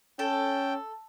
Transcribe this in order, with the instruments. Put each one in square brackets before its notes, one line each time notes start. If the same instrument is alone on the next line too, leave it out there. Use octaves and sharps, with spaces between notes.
[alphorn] C#4 [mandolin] A4 [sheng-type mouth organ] G5